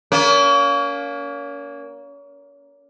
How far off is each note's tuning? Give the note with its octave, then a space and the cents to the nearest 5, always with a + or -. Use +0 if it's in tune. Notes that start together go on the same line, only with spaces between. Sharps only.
A#3 +10 C#4 +35